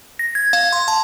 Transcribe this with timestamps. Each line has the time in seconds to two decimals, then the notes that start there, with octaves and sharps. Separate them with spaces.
0.19 A#6
0.35 G#6
0.53 F5
0.72 C6
0.88 A5